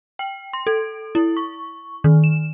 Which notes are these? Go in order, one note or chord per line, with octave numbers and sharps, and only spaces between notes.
G5
C6
A4
E4
C#6
D#3
E7